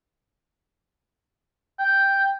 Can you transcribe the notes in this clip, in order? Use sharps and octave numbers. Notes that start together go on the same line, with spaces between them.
G5